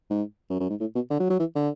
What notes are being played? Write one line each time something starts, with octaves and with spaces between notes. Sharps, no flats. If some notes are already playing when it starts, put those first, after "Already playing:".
G#2
F#2
F#2
G#2
A2
B2
D3
F#3
F#3
E3
D3